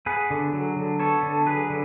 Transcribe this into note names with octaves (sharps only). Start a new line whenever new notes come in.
B3 G#4 B4
D3
F#3
D3
B3 A4 C#5
D3
F#3 G#4 B4
D3